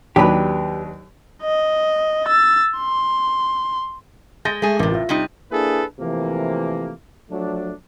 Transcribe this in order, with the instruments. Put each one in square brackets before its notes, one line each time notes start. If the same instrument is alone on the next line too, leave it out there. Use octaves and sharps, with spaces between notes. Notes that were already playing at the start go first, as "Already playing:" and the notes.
[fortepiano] D#2 F#3 D4 [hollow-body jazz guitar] G4 B4
[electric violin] D#5
E6 A6
C6
[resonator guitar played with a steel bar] G#3 [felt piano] G6 A6 A#6
[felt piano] G#3 [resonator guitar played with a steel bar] A3 G#4
[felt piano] A1 A#4 D6 [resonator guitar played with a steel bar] A2 C3
[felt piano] F4 E5
[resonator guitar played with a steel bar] C3 G3 D#4
[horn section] A#3 D4 E4 G#4 A4 B4
C3 E3 F3 A3 A#3
F3 F#3 A3 D4